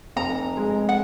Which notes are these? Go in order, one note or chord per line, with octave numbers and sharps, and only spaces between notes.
F1 A#5
G#3
F#5